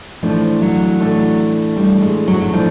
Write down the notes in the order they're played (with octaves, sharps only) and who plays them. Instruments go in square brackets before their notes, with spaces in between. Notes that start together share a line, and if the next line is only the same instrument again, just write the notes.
[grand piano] A2 E3 A3 D4 [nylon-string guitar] F3
[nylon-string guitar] F#3
[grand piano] A2 E3 A3 D4
[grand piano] A2 E3 A3 D4 [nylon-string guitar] G3
[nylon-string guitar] G#3
F#3
F#3
[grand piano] A2 E3 A3 D4 [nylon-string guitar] F3